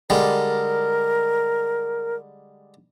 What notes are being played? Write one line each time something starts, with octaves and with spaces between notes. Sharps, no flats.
D3 G3 G#3 A#4